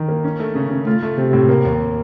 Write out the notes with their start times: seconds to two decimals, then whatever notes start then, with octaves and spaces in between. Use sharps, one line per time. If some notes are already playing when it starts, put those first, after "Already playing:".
Already playing: D#3
0.09 A#3
0.24 C#4
0.40 A3
0.55 C#3
0.70 C#3
0.86 A3 F4
1.03 A3
1.17 C3 C4
1.33 A2
1.49 A#3
1.65 D#2